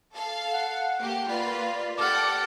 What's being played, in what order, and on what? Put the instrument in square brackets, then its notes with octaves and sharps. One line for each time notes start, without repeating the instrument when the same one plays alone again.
[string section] A4 F5
[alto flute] F#5
[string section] A#3 G4
[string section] A#3 F4 B4 [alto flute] D5
[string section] G4 D5 [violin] A4 F#5 [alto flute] A5 [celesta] D6 F6